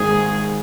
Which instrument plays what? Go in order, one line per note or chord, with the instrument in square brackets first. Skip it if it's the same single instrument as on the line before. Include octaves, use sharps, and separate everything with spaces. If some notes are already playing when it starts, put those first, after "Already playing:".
Already playing: [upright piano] G#1 G#2 D#3 [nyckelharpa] G#4